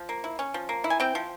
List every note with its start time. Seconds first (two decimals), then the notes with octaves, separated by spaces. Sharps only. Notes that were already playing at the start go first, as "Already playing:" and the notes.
Already playing: F3
0.09 A#3
0.24 E4
0.39 C#4
0.54 F3
0.69 A#3
0.84 E4
0.90 G#5
1.00 C4 G5
1.15 F3